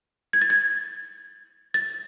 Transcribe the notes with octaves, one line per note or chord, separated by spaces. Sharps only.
G#6
A6
G#6
A6